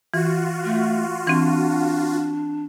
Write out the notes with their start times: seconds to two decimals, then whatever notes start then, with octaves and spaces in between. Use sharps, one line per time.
0.14 E3 F4 F#4
0.64 A3
1.27 E3 C4 D4